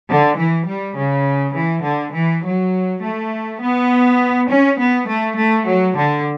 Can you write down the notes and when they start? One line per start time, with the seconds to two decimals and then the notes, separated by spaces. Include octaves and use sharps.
0.09 D3
0.38 E3
0.67 G3
0.96 C#3
1.55 E3
1.84 D3
2.13 E3
2.43 F#3
3.02 A3
3.61 B3
4.49 C#4
4.79 B3
5.07 A3
5.37 A3
5.66 F#3
5.96 D3